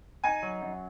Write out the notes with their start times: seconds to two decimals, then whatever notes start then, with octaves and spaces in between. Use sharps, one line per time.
0.24 D#4 G#5
0.43 F#3
0.62 F#2